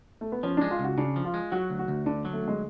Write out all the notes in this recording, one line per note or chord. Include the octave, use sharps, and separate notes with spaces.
A3
B3
F3 C#4
G#3 D4
F4
C#2 F#4
C#3 D4
F3
F4
G#3
F#3 F#4
D2
F#4
D2
D3 D4
F#3
A3
D2 G#3